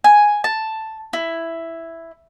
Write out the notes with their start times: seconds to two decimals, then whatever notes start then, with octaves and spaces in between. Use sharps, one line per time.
0.04 G#5
0.44 A5
1.13 E4